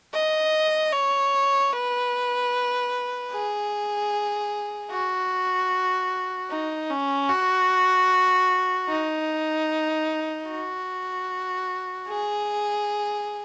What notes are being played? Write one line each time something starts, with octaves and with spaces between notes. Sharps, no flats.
D#5
C#5
B4
G#4
F#4
D#4
C#4
F#4
D#4
F#4
G#4